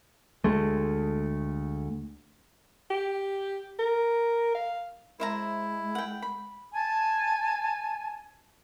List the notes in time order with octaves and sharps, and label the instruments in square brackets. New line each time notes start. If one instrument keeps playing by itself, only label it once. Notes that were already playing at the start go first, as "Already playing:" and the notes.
[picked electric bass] D2 G#3 A3
[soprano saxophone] G4
A#4
F5
[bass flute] G#3 [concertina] E4 [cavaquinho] C5 E5 A#5
[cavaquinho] F#5 G5
B5
[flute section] G#5 A5